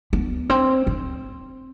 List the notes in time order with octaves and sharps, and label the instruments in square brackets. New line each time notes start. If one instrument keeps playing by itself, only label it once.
[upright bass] B3
C4
C4